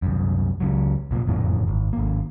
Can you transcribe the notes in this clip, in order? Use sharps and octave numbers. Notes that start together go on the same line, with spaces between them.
C2 F#2
C#2 C#3 F#3
C2 A#2
F#1 F2 A2 E3
G#1
G#1 A#3